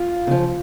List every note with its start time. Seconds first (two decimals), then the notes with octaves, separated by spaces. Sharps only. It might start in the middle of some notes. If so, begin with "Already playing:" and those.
Already playing: F4
0.27 C#3 F3